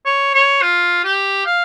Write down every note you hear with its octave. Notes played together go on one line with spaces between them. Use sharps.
C#5
C#5
F4
G4
F5